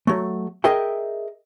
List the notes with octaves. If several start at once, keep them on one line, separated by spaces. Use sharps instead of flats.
F#3 A3
G#4 A#4 D#5 E5 G5